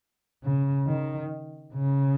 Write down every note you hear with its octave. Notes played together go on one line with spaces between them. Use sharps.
C#3
D#3
C#3